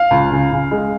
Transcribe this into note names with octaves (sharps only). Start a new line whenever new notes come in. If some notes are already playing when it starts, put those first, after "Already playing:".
Already playing: F5
C#2
C#3
C#3
G#3